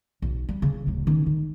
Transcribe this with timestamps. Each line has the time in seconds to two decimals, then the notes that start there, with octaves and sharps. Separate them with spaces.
0.22 B1
0.49 G3
0.62 C#3
0.87 D1 F#3
1.07 D#3 C#4
1.26 D#3